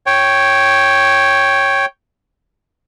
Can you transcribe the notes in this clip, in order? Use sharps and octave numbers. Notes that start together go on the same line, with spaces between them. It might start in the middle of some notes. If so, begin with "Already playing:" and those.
C#5 G5